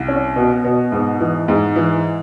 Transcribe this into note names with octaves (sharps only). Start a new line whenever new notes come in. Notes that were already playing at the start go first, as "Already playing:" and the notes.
Already playing: C2
C#4
B2
B2
G#2
E3
G#2
E3